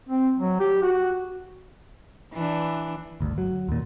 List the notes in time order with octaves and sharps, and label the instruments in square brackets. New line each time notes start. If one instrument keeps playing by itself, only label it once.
[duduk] C4
F#3
G4
F#4
[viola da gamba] E3 D4
[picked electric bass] G1 D2
F#3
D#2 A#2